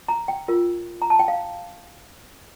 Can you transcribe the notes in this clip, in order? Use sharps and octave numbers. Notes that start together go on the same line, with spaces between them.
A#5
G5
F4 A#4
A#5
A5
G5
F5